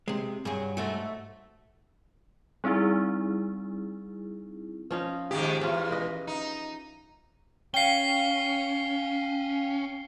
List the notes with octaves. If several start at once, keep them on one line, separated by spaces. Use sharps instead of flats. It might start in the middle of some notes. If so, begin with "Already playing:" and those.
C3 G#3
G2 F#3 G#4
G#2 A3 F#4
G3 C4 D#4 E4 G#4
F3 C#4 D#4
G#2 D#3 G4 G#4
E2 C#4 F4
B4 D#5
D#4
C#4 F5 G5 C7 G7